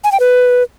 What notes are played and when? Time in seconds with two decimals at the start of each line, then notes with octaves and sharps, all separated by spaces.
0.04 G#5
0.12 G5
0.20 B4